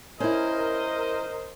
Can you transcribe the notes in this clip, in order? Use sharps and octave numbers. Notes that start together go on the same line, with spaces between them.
C#4 E4 A#4 C5 D#5